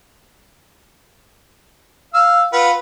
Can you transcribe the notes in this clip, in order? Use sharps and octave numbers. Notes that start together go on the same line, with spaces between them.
F5 E6
F4 B4 F#5